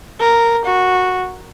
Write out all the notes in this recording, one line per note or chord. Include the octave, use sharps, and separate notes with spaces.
A#4
F#4